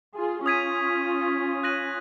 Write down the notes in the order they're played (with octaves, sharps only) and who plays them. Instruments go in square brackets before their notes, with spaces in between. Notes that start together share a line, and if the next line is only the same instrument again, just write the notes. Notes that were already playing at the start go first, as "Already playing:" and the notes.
[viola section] F4 G#4
[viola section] C#4 F4 [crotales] D#6 G#6 B6 D#7
[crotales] F#6 A#6 D#7 F#7